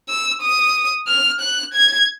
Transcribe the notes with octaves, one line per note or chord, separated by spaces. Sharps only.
E6
D#6
F6
F#6
G#6